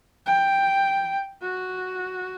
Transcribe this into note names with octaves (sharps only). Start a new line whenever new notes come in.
G5
F#4